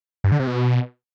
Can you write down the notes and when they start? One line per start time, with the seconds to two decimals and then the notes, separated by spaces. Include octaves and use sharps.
0.24 G2
0.32 D3
0.40 C3
0.47 B2